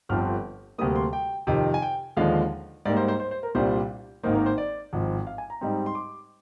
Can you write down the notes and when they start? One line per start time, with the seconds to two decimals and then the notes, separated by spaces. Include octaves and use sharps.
0.09 G1 G2 D3 F3 C4 F6
0.78 D2 C3 G3 A#3 D#6
0.96 C6
1.13 G5
1.47 F2 C3 D#3
1.74 G#5
1.82 G5
2.17 D#2 D3 F3 G#3 F5
2.85 G#2 G3 A#3 D5
2.97 C5
3.08 C5
3.20 C5
3.31 C5
3.43 A#4
3.55 C2 A#2 G3 D4 C5
4.23 G#1 G#2 D#3 A#3 D#4 C5
4.35 A#4
4.46 C5
4.58 D5
4.93 G#1 G#2 F3
5.27 F5
5.38 G#5
5.50 A#5
5.61 G#2 G3 C4 D#4
5.86 C6
5.95 D6